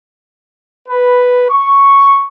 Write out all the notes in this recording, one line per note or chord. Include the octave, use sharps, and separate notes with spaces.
B4
C#6